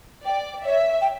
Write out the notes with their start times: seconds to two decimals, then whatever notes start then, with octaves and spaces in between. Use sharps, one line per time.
0.25 D5 G5
0.65 C#5 E5
1.01 G5